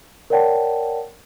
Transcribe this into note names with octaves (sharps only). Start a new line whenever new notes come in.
A#4 C#5 D5 F#5 G5 A5